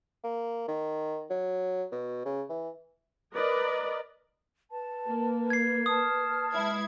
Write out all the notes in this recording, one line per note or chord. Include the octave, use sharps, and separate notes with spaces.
A#3
D#3
F#3
B2
C#3
E3
A#4 B4 D5 D#5
B4 A5
A#3
G#6 C7
A5 D#6 F6
G#3 E4 G#6